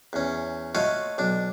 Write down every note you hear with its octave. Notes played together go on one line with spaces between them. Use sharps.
E2 C#4
A3 F4 F#4 C#5 D#5 F5
B1 D4